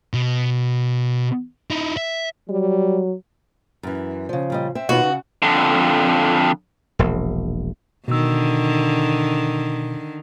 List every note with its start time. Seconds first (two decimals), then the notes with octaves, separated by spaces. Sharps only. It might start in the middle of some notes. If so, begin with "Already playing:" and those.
0.13 B2
1.70 D#4 E4
1.97 E5
2.49 F#3 G3
3.83 F#2 E3
4.29 C#3 F3
4.50 A#2 G3 D#5
4.75 C4 E5
4.89 D#2 B2 D#4 F4 F#4 B4 D#5
5.03 C#3
5.42 F2 D3
6.99 E1 A#1
8.08 B2 D3 D#3 E6